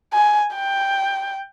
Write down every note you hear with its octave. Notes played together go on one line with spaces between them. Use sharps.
G#5
G5